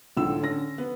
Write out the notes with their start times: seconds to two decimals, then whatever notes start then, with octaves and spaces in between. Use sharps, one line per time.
0.17 C#2 A2 D3 E6
0.39 D3 C#4 A#6
0.78 B3